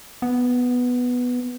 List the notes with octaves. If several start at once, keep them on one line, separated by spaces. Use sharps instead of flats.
B3